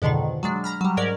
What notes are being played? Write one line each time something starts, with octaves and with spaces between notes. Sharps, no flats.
F2 G#2 B2 D3 D#3
F#3 G#3 D4
A#5 B5 F6
F#3 G3
G#2 C#4 A#4 D5